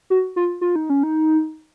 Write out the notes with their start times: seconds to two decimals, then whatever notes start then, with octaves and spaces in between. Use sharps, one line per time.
0.10 F#4
0.36 F4
0.61 F4
0.76 D#4
0.90 C#4
1.03 D#4